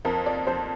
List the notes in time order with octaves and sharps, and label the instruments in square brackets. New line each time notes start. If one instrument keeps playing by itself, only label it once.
[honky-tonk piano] F2 [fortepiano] A#4
[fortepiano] D5
[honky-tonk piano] F2 [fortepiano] C5